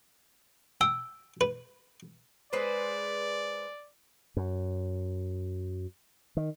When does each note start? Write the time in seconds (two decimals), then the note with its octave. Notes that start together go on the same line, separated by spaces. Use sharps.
0.81 G5 E6
1.41 B4
2.53 G#3 B4 C5 D5
4.37 F#2
6.37 D#3